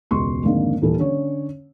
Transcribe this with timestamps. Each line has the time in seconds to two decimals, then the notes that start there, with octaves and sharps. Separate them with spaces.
0.11 E1 C#2 C6 C#6
0.43 F2 G#2 D3 D#3 A#3
0.82 D#1 E3 A4
0.98 D3 C#4 C#5